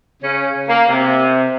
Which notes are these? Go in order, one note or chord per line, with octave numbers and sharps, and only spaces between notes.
C#3 C#4
A#3
C3